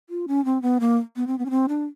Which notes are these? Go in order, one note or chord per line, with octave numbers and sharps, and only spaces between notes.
F4
C#4
C4
B3
A#3
B3
C4
B3
C#4
C4
D4